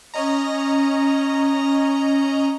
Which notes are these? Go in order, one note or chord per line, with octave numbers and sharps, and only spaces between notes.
C#4 D#5 A#5